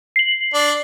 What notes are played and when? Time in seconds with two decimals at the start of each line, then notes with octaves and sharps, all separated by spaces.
0.16 C7 F#7
0.54 D4